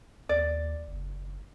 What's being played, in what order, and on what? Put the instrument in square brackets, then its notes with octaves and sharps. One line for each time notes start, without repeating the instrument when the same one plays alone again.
[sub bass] D#2 [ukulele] D5
[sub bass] F#1